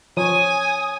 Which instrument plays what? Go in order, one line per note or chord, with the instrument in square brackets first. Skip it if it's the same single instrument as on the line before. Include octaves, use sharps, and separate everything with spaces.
[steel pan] F3 [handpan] C#5 [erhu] G#5 [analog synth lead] D#6